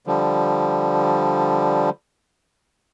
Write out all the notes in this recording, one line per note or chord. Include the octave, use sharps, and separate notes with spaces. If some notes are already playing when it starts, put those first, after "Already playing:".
D3 F3 G3